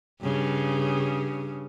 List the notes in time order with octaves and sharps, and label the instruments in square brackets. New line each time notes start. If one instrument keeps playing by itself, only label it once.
[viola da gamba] G2 C#3